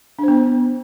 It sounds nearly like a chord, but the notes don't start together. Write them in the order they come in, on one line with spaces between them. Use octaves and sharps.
D4 C5 B3